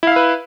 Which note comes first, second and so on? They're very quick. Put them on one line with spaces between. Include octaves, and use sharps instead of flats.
E4 F5 E5 B4